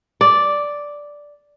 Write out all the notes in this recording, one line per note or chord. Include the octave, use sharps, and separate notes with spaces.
D5